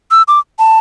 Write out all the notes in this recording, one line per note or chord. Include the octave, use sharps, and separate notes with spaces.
E6
D6
A5